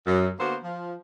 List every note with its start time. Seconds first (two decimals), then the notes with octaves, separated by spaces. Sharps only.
0.07 F#2
0.39 D3 A#3 B3 F#4 C5
0.63 F3